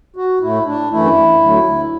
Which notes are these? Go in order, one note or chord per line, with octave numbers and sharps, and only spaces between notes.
F#4
A2 A3 E4
D4
F#2 E3 A3 E4
D2 D3 F#3 A3